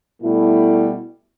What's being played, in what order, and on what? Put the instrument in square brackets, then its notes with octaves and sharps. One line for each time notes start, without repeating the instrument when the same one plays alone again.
[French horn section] B2 G3 A3 E4